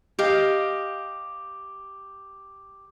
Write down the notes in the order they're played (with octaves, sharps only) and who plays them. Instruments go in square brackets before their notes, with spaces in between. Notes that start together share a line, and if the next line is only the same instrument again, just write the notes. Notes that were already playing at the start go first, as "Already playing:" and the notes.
[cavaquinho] G4 D#5 F5